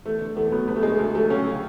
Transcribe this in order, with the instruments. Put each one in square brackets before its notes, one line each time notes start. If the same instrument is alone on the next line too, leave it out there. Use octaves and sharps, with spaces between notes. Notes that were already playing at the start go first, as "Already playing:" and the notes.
[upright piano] E2 A3
D3
E2 A3
F#3 B3
D2 B3
A3
D3 G#3
A3
D2 G#3
F#3 A3
C#2 C#4
C#3